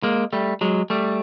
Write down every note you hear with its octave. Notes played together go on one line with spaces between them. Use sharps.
G#3 A#3
G3 A3
F#3 G#3
G3 A3